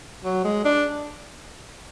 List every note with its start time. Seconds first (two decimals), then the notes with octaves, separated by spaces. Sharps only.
0.24 F#3
0.44 G#3
0.64 D4